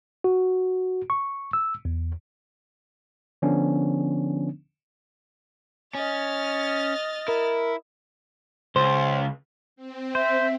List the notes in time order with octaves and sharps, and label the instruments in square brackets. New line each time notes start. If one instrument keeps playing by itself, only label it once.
[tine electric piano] F#4
C#6
E6
E2
D3 F3 B3 C#4 D4
[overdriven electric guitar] C#4 [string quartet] D#5 F6 A6
[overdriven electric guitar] E4 [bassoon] A#4
[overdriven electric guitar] C#2 [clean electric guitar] C5
[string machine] C4
[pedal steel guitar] C5 [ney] E5